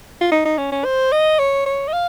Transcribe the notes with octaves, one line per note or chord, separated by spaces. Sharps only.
F4
D#4
D#4
C#4
C#4
C5
D#5
C#5
C#5
D#5
F5